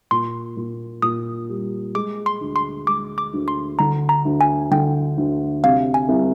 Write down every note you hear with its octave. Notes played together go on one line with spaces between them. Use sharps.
A#2 C6
A#2
A#2 D#6
G3
G#3 D6
C6
D2
C6
G#3 D6
D6
D2
C6
D3 A#5
A#5
D2
G#5
D3 G5
D2
C3 F5
G#5
C2